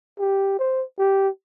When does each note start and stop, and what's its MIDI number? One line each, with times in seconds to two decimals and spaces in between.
0.19 0.56 67
0.59 0.83 72
0.99 1.29 67